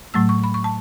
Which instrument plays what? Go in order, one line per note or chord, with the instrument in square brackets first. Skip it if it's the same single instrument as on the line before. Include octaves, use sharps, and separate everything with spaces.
[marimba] A2 F#3 A3 E6
C#6
B5
C#6
A5